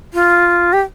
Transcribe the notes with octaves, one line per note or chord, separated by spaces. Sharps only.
F4
G4